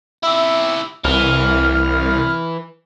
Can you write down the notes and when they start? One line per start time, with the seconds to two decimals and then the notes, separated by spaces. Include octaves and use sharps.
0.23 E4 G4 E5
1.04 C2 E3 F6